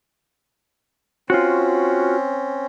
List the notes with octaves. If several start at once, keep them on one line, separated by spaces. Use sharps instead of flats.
C4 C#4 F4 F#4